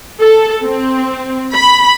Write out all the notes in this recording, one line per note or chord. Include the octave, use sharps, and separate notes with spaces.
A4
C4
B5